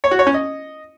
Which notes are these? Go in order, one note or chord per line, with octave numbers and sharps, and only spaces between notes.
C#5
F#4
C#5
C#4
D#5